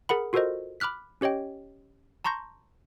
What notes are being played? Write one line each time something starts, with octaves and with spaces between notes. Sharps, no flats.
G#4 A#4 F#5 B5
F4 F#4 A4 A#4 C5 D#5
B5 D6 F6 F#6 B6
C#4 G4 C#5 D#5 G5
A5 A#5 C6 C#6 G6 A#6